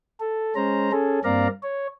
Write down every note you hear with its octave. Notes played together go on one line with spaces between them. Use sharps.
A4
G#3 C#4 C5 A#5
C#4 G#4 A4
G2 A#3 C4 D5 F5 A#5
C#5